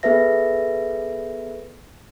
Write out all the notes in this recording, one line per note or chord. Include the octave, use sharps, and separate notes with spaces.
B3 G#4 A4 B4 E5 A#6